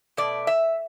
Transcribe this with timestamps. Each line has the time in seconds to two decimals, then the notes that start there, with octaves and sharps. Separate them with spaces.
0.17 B2 A3 D5
0.47 E5